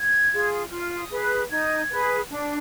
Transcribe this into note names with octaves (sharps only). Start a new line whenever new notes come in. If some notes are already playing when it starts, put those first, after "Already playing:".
Already playing: G#6
F4 G#4
F4 F6
D#6
G#4 B4
F#6
D#4 G#6
G#4 B4
D4